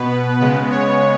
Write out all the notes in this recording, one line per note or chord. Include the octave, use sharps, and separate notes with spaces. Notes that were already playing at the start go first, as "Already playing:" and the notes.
Already playing: B2 B3 B4
C#3 G#3 B3 B4
C#5